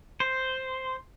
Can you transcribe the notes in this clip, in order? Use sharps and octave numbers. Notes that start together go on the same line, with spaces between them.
C5